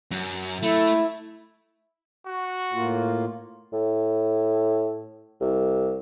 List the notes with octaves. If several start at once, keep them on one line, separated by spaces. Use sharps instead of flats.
F#2
A3 E4
F#4
A2 A#3 F4
A2
C2